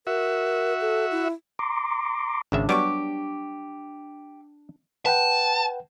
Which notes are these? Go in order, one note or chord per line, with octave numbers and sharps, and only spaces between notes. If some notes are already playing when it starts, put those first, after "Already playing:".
F#4 A#4 E5
A4
E4
A#5 C6 D6
G#1 C#3 D4 E5
F#3 G3 B3 G4 C#6 D6
B4 F#5 G5 A5